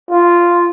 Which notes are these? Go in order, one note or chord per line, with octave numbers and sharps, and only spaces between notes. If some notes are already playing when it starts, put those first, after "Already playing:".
F4